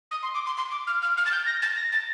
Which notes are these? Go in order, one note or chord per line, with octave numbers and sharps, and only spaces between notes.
D#6
C6
D6
C6
C6
D6
F6
F6
F6
A6
G6
A#6
A6
A#6
A6